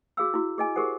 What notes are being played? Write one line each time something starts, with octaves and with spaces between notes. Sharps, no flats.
F#4 G#4 F5 E6
E4 F#4
G#4 D#5 G#5
G4 G#4 A#4 C5 F#5 D6